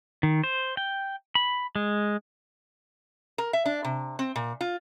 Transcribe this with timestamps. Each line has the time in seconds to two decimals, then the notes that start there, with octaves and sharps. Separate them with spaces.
0.23 D#3
0.44 C5
0.77 G5
1.35 B5
1.76 G#3
3.38 A#4
3.53 E5
3.66 D4
3.85 C3
4.19 C4
4.36 A#2
4.61 F4